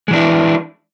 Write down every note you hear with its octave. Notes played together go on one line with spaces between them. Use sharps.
E3 G#3 D4 E4